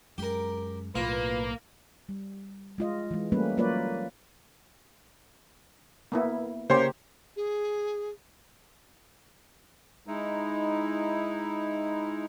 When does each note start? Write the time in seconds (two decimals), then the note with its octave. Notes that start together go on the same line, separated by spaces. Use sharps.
0.18 F#2 G#3 G4 A#4
0.95 B1 A2 A#3 F4 B4
2.09 G3
2.78 G#3 F4 D#5
3.11 E3 G#3
3.32 G3 A3 A#3 C#4 B4
3.57 F#3 A#3 F4 B4 C#5 D5
6.12 A#3 B3 E4
6.70 C#3 A#3 G4 C5 C#5 C6
7.36 G#4
10.07 G#3 D#4 E4